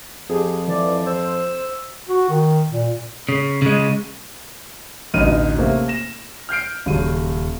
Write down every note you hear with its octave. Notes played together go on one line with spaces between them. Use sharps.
F2 G4 G#4
E3 D5
C5 E6
F#4
D#3
A#2
C#3
C#3 G#3
A1 D2 B2 D#4 F6 D#7
C3 A3 A#3 C4 C#4
A#6 E7
F6 G6 C7 D7
D#1 C#3 F#3 D#7